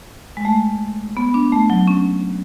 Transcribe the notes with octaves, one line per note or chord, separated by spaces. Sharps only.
G#3
A3
B3
D4
A3
F#3
C#4